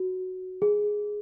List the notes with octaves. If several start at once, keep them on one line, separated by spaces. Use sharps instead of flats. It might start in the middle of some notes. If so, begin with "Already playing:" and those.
Already playing: F#4
G#4